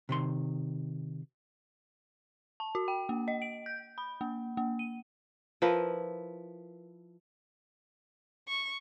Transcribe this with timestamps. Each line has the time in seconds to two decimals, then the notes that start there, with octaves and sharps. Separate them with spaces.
0.09 C3 D#3 C6
2.60 A5
2.75 F#4
2.88 G5
3.09 A#3
3.28 D#5
3.42 D7
3.66 G6
3.98 B5
4.21 A#3
4.57 A#3
4.79 D#7
5.62 F3 E4 A#4 B4
8.48 C#6